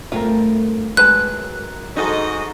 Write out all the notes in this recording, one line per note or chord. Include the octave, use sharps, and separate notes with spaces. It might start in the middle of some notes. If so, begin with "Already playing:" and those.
G2 A3 C4 F4 A#4
F#2 D#3 F#3 G#3 B4 A5 F#6
G#2 D#4 F#4 A4 D#5